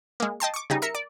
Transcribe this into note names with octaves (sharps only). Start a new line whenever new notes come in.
G#3 A#3
D#5 G5 A5 C6
C#6 D6
C#3 G3 D#4
A#4 E5 C#7
D5